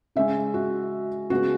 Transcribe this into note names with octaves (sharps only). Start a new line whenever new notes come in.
C#3 G#3 C#4 E5
F#4
C#3 G#3 B3 F#4